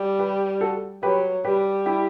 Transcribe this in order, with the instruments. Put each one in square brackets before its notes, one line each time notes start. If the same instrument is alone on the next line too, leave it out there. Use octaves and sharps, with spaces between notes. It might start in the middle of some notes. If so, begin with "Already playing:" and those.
Already playing: [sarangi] G3
[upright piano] G4 B4
F#4 A4
[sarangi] F#3 [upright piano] G4 B4
[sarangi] G3 [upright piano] G4 B4
[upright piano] E4 G4